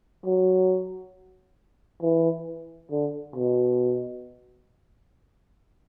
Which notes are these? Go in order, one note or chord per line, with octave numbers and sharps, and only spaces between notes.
F#3
E3
D3
B2